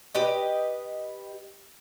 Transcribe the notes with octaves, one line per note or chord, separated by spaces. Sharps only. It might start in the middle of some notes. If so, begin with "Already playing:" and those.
G4 B4 D#5